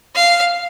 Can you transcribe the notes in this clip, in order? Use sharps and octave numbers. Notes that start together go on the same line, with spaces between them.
F5